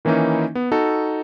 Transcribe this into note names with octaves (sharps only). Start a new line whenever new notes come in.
D#3 E3 A#3 C#4 D#4 E4
B3
D#4 F#4 A4